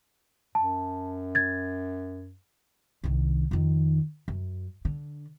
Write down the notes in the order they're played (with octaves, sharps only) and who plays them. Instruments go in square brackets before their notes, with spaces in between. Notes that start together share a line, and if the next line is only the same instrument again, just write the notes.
[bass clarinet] F#2 [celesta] A5
[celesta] G#6 A6
[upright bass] C2 D#3
F2 D#3
F#2
D3